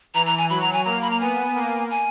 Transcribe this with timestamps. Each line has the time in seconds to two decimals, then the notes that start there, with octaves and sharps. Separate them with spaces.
0.14 E3 A#5
0.26 A#5
0.38 G#5
0.49 F#3 B5
0.61 A#5
0.73 G#5
0.85 A#3 A#5
1.01 B5
1.10 A#5
1.20 B3 G#5
1.55 A#3
1.91 G#5